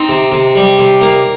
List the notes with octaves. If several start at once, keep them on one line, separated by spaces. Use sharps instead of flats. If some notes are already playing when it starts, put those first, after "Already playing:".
Already playing: C4 D#4
C3
C3
G3
C3
A#3